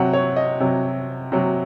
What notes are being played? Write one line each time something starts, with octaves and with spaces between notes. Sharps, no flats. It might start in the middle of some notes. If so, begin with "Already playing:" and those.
Already playing: C3 F#3 F#5
C#5
D#5
C3 F#3
C3 F#3